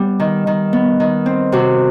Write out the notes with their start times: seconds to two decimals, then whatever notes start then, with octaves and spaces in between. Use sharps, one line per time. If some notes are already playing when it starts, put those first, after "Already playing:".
Already playing: G3 B3
0.20 D#3
0.47 D#3
0.73 B3
1.00 D#3
1.26 C4
1.52 C3 F#4